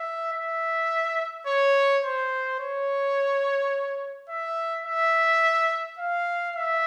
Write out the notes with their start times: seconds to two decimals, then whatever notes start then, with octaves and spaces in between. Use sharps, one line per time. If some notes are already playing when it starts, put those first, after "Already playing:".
Already playing: E5
0.33 E5
1.47 C#5
2.04 C5
2.60 C#5
4.29 E5
4.86 E5
5.99 F5
6.56 E5